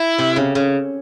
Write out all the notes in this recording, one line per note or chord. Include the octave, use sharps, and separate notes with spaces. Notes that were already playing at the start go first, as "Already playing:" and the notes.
Already playing: E4
C3
C#3
C#3